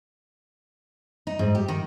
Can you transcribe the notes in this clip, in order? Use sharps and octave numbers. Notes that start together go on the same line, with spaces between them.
D#4
G#2
G4
D#3